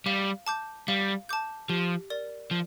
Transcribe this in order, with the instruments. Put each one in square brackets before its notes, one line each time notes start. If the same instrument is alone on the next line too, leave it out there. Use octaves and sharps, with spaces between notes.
[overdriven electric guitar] G3 [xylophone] F5
[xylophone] A5 D6 G6
[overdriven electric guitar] G3 [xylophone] F5
[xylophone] A5 D6 G6
[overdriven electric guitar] F3 [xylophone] G4
[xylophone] A#4 D5
[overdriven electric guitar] F3